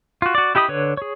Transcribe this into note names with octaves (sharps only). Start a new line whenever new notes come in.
F4 F#4
F#4 D5
E4 G4 D#5 B5 D#6
D3 B4 C#5
G#4 C#5